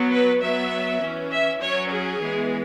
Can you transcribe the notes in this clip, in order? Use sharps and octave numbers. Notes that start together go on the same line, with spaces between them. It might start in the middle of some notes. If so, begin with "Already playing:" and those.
Already playing: F#3 B3
B4
F#3 B3 E5
E3 C#4
E5
F#3 C#4 C#5
G#4
E3 G#3 B3